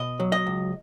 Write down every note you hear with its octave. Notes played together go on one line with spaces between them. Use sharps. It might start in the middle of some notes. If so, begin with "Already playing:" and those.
Already playing: B2 D#5
F#3
D#5
C#2